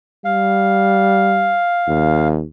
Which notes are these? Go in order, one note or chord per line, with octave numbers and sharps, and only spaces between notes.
G3 F5
D#2